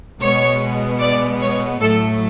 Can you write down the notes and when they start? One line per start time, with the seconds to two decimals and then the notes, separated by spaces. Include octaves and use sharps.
0.21 B2 G#3 B3 C#5
1.01 D5
1.41 C#5
1.81 A2 F#3 A3 A4